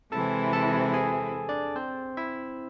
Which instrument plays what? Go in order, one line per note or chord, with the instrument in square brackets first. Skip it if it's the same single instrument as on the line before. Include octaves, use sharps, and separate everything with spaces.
[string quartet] C3 E3 G#3 C4 E4 [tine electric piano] A4 A5
[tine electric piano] A4 A5
G#4 G#5
D4 D5
C4 C5
E4 E5